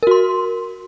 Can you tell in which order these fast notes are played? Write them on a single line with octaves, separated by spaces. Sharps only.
A#4 F#4 C6